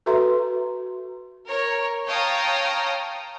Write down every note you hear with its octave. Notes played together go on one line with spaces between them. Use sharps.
F#4 A4 B4 E5 A#5 C6
A#4 C#5
C#5 F5 G5 A5 A#5 D#6